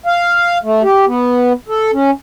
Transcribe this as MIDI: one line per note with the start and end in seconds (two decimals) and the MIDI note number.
0.06 0.58 77
0.63 0.82 57
0.83 1.05 67
1.07 1.53 59
1.68 1.91 69
1.93 2.11 61